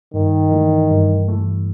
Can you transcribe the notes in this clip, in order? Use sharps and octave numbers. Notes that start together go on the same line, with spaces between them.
G2 D#3
E3 A3
G2
E3 A3